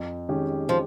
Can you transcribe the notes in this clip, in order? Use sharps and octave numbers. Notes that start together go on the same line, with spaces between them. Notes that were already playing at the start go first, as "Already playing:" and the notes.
Already playing: F2
D#3 G#3 C#4 G4
F3